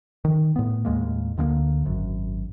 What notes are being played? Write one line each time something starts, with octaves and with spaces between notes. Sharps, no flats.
D#3
A2 B3
D#2 A2 G#3 A#3
D2 D3 G#3 A#3
G#1 F#2